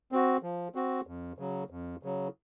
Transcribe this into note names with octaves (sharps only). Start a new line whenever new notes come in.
C4 F#4
F3
C4 F#4
F2
C#3 F#3
F2
C#3 F#3